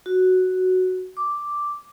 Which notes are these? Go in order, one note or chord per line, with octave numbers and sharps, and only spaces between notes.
F#4
D6